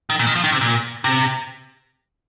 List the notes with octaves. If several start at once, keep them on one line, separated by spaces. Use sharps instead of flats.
D#3
A#2
D#3
F3
D#3
C3
A#2
C3